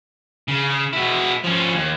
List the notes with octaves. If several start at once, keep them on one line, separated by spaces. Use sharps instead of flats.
C#3
B2 E4
F3 C#4
D#2